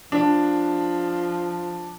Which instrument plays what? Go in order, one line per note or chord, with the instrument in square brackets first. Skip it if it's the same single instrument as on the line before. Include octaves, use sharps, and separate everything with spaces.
[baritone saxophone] F3 [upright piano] D4